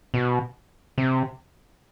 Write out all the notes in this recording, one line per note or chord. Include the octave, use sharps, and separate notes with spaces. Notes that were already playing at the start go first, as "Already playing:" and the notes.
B2
C3